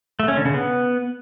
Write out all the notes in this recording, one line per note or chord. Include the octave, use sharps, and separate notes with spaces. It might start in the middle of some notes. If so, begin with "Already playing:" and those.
A3
C#4
D3
C#3
B3